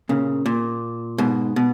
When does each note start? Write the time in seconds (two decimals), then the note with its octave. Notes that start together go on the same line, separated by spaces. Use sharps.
0.09 A#2 C#3
0.46 A#2
1.18 G#2 B2
1.56 B2